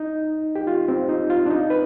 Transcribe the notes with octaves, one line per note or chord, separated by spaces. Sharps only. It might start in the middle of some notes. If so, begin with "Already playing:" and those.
Already playing: D#4
G4
F4
C4
D#4
F4
D4
D#4
B4